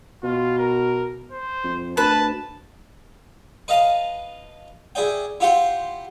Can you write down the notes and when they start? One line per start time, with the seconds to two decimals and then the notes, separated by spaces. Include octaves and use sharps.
0.23 B2 F4
0.58 A#4
1.32 C5
1.64 F2
1.97 D2 B4 A5
3.68 B4 D#5 F5 A5
4.95 E4 G#4 D5 G5
5.40 E4 F4 G4 F#5 G5 C6